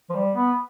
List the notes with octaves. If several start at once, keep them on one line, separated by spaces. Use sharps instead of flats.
F3
G3
B3